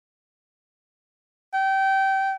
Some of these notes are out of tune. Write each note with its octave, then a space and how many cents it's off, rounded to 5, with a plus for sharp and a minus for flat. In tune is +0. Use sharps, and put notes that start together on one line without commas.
G5 -25